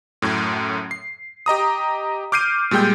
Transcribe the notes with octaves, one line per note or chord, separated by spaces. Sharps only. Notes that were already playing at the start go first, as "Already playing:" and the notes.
F#2 A2
C7
G4 D#5 A#5 D#6
D6 F6 G6 C7 D7 D#7
A#2 G3 G#3 G5 G6